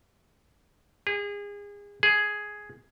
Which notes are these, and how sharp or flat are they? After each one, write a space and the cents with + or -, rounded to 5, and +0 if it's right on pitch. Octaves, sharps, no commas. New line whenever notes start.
G#4 -30
G#4 +5